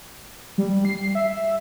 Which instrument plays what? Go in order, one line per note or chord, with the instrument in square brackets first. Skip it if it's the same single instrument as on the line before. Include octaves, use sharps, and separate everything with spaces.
[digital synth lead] G3
C7
E5